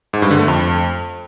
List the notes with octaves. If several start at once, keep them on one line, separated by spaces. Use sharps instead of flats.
G#2
G2
D3
A3
F2